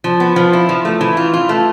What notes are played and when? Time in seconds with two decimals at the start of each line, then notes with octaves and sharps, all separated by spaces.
0.04 F3
0.20 B3
0.36 F3
0.53 E4
0.69 F3
0.85 A3
1.01 E3
1.17 F4
1.34 F4
1.49 A3